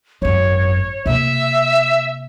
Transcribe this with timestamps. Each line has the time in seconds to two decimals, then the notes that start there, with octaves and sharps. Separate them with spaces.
0.22 G#1 F#2 C#5
1.06 C3 A#3 E5